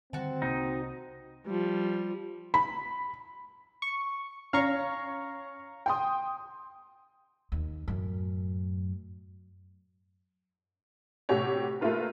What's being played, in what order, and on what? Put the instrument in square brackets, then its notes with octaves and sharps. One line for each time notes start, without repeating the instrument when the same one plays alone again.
[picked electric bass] D3 D#3 G3 [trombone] C4 [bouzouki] F#4 A5
[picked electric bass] C2 C3 A#3 [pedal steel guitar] D#4
[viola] F3 G3
[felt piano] B5
[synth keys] C#6
[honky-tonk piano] C#4 C#5 [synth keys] F5 A#5 C#6
[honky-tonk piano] G5 C6 D#6
[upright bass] D#2
F#2 A2
[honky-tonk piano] A2 C3 F#4 G4 C#5
A3 A#3 E4 F4 B4